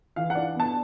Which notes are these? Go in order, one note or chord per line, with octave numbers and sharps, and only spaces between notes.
E3 F5
F#5
D4
B3 A5